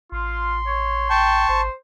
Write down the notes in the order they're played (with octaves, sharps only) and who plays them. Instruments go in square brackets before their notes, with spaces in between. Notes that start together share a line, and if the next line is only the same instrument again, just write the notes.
[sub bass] A1 [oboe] F4 [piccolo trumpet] C6
[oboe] C#5
[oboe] G5 [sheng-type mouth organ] A5 C#6
[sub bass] G#1 [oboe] C5